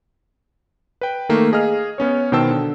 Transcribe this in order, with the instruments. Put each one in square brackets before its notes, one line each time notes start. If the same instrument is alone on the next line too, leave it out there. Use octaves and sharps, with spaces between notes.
[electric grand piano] B4 G5
D#3 A3 A#3
G#4 D#5 F5 F6
B3 C#4 C#5
B2 D#3 C5 G5 A5 E6
D3